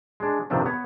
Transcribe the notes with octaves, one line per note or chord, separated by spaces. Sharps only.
G#3 D4
G2 C3 D#3 F3 D4
B3 C#5